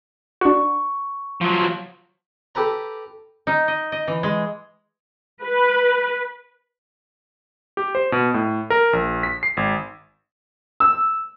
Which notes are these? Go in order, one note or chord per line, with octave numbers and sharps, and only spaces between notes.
D4 F#4 C#6
F3 F#3
G4 A4 B4 A#5
D#4
D#5
D#5
E3
G#3
B4
G4
C5
B2
A2
A#4
A#1
B6
C7
G#1
E6